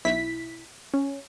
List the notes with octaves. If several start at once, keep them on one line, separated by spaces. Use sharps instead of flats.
B1 E4 B6
C#4